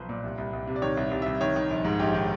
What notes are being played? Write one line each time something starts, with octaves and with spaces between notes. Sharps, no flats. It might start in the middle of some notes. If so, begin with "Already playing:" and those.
Already playing: B1 F3 B4 C5
A#2
C2
C2
C2
C3
D5
D#3 C#5
C2
C2
C2 E5
D#3 C#5
D#3
A#1
G#2
A#1 G4
D#3